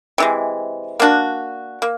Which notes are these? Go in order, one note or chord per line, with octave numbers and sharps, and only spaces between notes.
C3 E3 G#3
A#3 D4 F#4
A#3